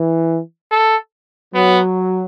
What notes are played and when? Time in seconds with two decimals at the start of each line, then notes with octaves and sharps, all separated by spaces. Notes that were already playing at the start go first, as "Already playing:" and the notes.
Already playing: E3
0.71 A4
1.54 F#3 B3